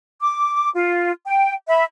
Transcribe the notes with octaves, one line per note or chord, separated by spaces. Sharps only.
D6
F4
G5
E5 B5